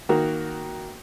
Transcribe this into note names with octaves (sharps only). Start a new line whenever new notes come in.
D#3 A#3 F#4 A#4